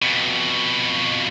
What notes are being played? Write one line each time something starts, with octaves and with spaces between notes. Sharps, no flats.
F2 B2